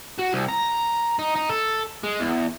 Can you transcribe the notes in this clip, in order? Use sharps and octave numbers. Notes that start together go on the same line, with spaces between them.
F#4
C2
A#5
D#4
D#4
A4
G#3
E2